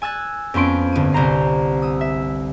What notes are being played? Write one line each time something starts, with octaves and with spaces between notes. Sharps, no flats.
G#5 E6 F#6 A6
F2 B3 C#4 C6 D7
G1 D#7
C2 C5 A#5 C7
D#6 E6
E5